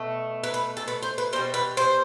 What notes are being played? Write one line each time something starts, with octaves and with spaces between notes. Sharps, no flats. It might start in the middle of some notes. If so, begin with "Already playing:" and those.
Already playing: B2 A3
B4
B4
A4
B4
C5
B4
B2 G3 C5
B4
C5